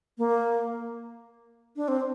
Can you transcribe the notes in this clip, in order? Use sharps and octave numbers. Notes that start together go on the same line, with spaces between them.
A#3
D4
C4